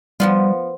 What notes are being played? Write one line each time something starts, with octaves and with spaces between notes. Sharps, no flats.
F3 G3 B3 F4